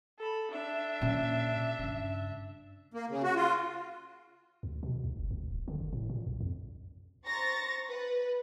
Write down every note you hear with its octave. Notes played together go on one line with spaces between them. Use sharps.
A4 B5
D4 E5
A#2 C#3
G2 C#3
A#3
C#3
F#4
F4
D2
B2
C#2
F#1
D2
D1
D3
G1
A2
A#2
B1
F2
C5 A#5 C#6 A6 A#6
B4